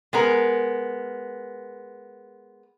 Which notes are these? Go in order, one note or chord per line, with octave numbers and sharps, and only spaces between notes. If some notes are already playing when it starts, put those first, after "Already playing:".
G#3 B3 A#4